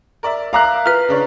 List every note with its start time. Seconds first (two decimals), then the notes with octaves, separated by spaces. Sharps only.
0.23 A#4 D5 E5
0.53 A#4 E5 F5 A#5 D6 F#6
0.86 F4 B4 F6
1.09 C#3 D4 C#5